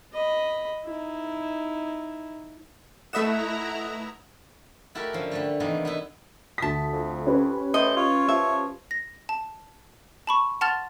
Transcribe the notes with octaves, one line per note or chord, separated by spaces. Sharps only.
D#5 B5
D#4 E4
A3 E4 B4 D#5 E5 F#5 A#5 E7
A3 E4 F#4 G4 A4 A#4
D3 F3 C#4
D3 G3 A3
C3 D#3 E3 A#3 B3
B3 D#4 E4 B4
D2 A5 D#6 B6
F2
C#4 G4 B4
A2 C5 D#5
F4 C#5
F3 E5
A#6
A5
A5 B5 C#6
F#5 A5 C6 F6 A6 F7